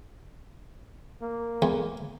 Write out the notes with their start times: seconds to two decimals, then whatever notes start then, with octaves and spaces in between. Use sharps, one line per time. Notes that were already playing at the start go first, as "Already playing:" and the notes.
1.22 A#3
1.62 E2